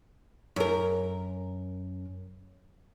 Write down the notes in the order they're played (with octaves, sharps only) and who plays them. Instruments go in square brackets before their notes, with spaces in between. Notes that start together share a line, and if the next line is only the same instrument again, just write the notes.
[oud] F#2 A#4